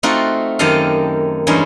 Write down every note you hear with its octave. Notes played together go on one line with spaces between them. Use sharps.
A3 C4 D#4 F4 F#4
F#2 D#3 G4 A4 D#5 F5
E2 G2 G#3 C#4 D#4